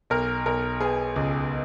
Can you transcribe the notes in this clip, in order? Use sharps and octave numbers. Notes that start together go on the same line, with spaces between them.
B1 A#4
B1 A#4
B3 G#4
C#2